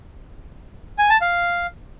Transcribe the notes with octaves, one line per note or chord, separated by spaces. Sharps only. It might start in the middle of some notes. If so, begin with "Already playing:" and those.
G#5
A5
F5